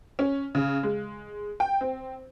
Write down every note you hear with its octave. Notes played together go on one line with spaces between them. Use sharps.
C#4
C#3
G#3
G5
C4